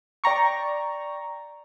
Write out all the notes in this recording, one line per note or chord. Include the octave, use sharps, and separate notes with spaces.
D5 G5 A#5 C#6